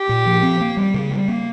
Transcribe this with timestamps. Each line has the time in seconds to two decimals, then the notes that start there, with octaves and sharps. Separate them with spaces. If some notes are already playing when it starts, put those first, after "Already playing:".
Already playing: G4
0.09 A#2
0.26 F3
0.43 C4
0.61 A#3
0.77 G3
0.94 C#3
1.11 G3
1.28 A#3